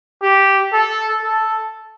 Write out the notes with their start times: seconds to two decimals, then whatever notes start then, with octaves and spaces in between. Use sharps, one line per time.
0.22 G4
0.73 A4
1.23 A4